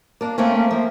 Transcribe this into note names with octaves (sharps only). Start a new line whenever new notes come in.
A#3 D4
A3 A#3 C4 C#4
A#3
F3 A#3